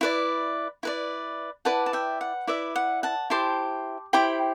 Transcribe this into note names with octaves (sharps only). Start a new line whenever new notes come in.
E4 B4 D5
E4 B4 D5
E4 B4 D5 F#5 A5
A5
E5 G5
F#5
E4 B4 D5 E5
F#5
F#5 A5
E4 G4 C5 A5 C6
E4 G4 C5 G5 B5